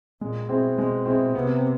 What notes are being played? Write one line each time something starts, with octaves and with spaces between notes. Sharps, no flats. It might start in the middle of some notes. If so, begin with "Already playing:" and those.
A#2 G#3
B2 C4 E4 G#4
G#3
C4 E4 G#4
C3 B3